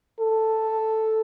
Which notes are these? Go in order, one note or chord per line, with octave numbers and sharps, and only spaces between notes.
A4